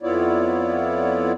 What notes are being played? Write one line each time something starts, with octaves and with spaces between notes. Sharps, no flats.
F2 B3 E4 F4 C#5 D5